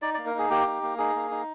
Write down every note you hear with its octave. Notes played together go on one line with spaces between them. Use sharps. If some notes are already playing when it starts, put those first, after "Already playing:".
D#4 D5
A#3 D5
A#4
D#4 G#4
A#3 G4
D#4
A#3
D#4 G#4
A#3
D#4